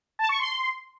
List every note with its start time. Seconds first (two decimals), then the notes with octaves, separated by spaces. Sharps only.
0.19 A5
0.29 C#6
0.39 C6